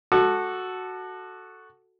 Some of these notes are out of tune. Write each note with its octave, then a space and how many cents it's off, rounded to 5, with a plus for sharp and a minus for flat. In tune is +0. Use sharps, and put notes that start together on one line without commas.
F#4 +0 A4 +0 D6 +35